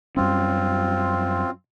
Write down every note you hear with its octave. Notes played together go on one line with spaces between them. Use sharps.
F#2 G3 C4 C#4 F4